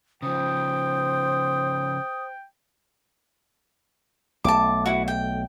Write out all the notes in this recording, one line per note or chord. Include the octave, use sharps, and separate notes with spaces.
C#3 F3 C5 G5 D#6
B1 A3 A5 D6
E4 F#4
G5